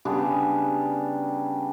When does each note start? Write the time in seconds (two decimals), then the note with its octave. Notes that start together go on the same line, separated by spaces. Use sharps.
0.05 C#3 G3 B3 D4